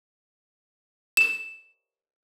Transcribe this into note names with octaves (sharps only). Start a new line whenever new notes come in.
E7